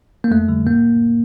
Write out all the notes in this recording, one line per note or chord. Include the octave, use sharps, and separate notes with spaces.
A#3
F2 A3
D3 G3
A2 A#3